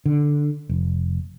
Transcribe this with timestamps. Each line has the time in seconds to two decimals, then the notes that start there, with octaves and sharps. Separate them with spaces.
0.06 D3
0.69 F1